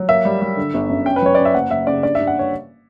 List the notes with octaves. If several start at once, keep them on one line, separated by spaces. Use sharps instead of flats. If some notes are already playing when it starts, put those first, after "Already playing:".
Already playing: F#3
A#3 E5
G3
G3
D3
G1
F#2
C#4 G5
B4
F#3 C#5
C#4 D5
E5
F#1 F#5
F#1 E5
C#3 D5
G2 D5
G2 E5
F#5
C#5